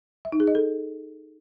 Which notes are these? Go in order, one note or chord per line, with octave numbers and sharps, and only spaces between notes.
E5
D#4
G#4
D#5
A4